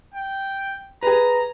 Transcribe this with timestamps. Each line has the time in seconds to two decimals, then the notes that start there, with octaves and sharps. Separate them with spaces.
0.14 G5
1.03 G#4 B4 A#5